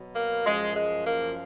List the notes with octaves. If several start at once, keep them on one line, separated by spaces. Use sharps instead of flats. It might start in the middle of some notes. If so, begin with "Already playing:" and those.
Already playing: B2 F#3
A#3
F#2 F3 G#3
G#3
A#3